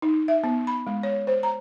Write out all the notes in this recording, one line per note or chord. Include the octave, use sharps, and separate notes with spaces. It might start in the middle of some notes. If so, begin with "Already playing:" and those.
D#4
E5
B3
B5
G#3
C#5
C5
A#5